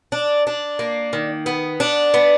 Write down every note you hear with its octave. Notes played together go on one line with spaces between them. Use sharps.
D4
D4
A#3
D#3
B3
D4
B3